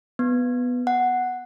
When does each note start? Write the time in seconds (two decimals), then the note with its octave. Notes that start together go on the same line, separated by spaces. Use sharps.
0.19 B3
0.87 F#5